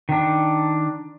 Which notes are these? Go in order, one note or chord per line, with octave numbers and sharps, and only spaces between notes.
D#3 D4